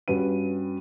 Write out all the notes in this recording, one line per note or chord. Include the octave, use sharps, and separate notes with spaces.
G2 C#4 F#4 B4 D#7